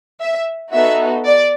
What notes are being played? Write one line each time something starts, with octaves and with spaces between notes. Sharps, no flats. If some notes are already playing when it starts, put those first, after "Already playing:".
E5
B3 D#4 F#4 A4 E5
D5